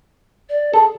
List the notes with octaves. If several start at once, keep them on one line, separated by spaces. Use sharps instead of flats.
D5
G#4 A4